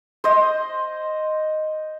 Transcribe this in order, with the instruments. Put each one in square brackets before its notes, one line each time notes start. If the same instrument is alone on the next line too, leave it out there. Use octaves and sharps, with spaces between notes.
[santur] C5 D#5